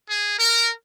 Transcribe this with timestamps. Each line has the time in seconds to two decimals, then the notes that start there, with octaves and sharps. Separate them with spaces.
0.10 G#4
0.39 A#4